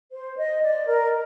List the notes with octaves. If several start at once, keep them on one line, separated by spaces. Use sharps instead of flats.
C5
D#5
D5
A#4